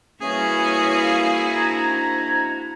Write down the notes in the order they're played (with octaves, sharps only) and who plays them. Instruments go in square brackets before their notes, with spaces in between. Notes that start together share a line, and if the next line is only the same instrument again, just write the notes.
[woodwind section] E3 G3 C#4 [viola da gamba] A#3 E4 F#4 [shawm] G#4
[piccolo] F5
[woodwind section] G#2 D4 A#5 [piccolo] G#6